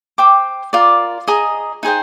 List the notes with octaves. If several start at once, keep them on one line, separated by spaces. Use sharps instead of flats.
C5 G5 D6
F4 A#4 D5
G#4 D#5 A#5 D#6
D#4 G#4 C5 G5